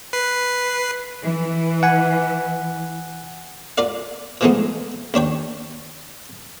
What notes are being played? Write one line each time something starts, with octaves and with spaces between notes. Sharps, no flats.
B4 C7
E3
F#5 G#5
F4 A#4 D5 F5
E3 F3 G#3 A3 B3 D#4
D#2 D4 C#5 G5